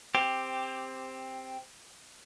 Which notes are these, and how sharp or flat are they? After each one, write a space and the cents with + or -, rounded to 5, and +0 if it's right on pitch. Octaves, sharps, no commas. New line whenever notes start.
C4 +0 G4 +10